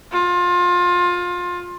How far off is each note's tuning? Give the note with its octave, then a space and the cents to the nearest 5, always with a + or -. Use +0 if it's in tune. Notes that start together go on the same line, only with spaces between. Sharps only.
F4 +25